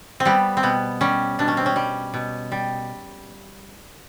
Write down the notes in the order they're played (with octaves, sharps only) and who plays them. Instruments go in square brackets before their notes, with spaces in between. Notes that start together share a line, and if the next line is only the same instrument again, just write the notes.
[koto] C4
G3 B3
C4
B2 B3
G3 C#4
B2 D4
C#4
C4
C#4
G3
B2
G3